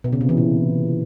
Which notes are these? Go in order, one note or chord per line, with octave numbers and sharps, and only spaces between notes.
B2
C#3
C3
E3
A#2